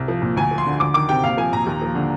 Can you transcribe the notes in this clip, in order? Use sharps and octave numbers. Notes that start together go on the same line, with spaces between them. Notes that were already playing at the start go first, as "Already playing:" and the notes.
Already playing: C2
F3
A#2
D2 G#5
F3
C6
D3
D2 D6
D#3 D6
C3 G5
A#1 F5
F3 G#5
A#2 A#5
D#2
F3
D3